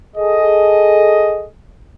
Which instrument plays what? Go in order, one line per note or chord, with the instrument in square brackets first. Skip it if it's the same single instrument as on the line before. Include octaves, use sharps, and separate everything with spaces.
[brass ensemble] G#4 A4 D#5